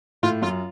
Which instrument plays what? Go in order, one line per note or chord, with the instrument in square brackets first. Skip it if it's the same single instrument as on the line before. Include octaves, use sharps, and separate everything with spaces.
[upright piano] A2 [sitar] F4
[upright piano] F#2 [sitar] F4